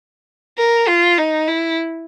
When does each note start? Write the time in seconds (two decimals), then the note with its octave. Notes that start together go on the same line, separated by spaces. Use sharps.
0.58 A#4
0.88 F4
1.18 D#4
1.48 E4